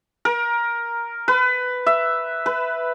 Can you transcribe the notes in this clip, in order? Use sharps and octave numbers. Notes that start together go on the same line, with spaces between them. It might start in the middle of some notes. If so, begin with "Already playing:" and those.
A#4
B4
E5
B4